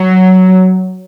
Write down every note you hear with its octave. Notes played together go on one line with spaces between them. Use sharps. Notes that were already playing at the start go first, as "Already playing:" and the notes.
Already playing: F#3